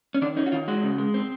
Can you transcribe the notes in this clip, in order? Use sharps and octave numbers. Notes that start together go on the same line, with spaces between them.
C#4
D#3 D4
C#4 D#4
F#4
D#3 F4
G#3 F#4
C#3
G#3
C4